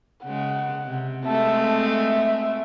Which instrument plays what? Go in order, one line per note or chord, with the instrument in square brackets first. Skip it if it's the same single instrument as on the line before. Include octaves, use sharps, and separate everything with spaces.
[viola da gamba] C#3 G#3 [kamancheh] F#5
[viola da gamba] C3
[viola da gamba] G#3 A3 C4 [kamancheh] E5 A5
[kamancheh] E5